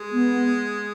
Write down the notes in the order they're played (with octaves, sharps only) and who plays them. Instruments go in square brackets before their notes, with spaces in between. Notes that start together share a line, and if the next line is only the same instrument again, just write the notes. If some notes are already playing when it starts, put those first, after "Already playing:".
Already playing: [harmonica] G#3
[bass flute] B3